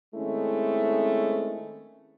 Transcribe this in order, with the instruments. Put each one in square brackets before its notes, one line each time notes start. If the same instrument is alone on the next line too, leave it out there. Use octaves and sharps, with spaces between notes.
[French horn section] D#3 G#3 A3 C4 C#4 E4